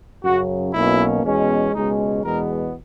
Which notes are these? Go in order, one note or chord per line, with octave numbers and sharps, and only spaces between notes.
F#2 C#3 F#3 F#4
B1 B2 A#3 C#4 E4
E2 B2 G#3 C#4
C#2 B2 G#3 C#4 D#4
E2 B2 G#3 B3 A#4